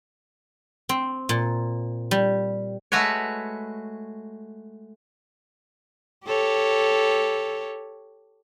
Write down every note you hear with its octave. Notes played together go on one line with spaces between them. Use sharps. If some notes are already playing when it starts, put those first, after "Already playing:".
C4
A#2
G3
G#3 A3 F#4 B4 C#5
G4 A4 C#5